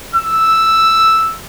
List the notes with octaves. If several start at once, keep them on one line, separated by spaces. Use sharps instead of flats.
E6